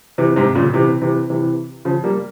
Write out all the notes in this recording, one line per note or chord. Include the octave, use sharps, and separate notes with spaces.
C3 E3
G#2 C3
A#2 C#3
C3 E3
C3 E3
C3 E3
C#3 F3
G3 A#3